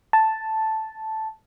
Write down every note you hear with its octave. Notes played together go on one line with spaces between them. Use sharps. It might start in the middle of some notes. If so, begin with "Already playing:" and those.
A5